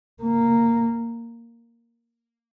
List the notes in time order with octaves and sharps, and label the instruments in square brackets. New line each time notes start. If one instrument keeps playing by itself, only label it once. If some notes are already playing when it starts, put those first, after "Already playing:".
[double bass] A#3